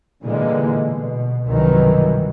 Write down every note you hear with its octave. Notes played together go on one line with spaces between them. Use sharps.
A#2 D3 E3 G3 G#3 A#3
B2
C2 G2 B2 D#3 E3 F#3